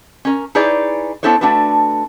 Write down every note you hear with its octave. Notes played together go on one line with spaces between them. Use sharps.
C#4 A#4
D#4 E4 G#4 B4 C#5 D5
B3 D4 E4 A4 C5 C#5
A3 D4 F#4 A4 B4